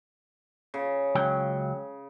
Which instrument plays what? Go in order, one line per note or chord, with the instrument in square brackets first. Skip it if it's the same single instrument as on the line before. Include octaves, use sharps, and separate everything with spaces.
[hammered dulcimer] C#3
[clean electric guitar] C#2 F#3 G5